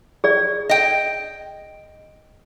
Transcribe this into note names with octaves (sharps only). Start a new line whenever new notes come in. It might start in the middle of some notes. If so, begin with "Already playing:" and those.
G#4 D5
D#5 G5